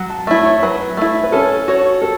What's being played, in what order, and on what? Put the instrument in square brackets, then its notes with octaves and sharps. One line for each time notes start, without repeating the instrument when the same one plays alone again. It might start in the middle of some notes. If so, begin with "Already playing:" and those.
Already playing: [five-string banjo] F#3 [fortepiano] F#5
[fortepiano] A5
[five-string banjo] A3 E4 [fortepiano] E5
[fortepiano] C#5
[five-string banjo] F#3 [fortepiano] B4
[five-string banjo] A3 E4
[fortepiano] B4
[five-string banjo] C#4 [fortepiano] A4
[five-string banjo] F#4 C#5
[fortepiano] A4